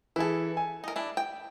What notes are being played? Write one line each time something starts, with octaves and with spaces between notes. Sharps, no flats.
E3 E4 G#4 A4
G#5
D#4 A#4
D4 E4
G5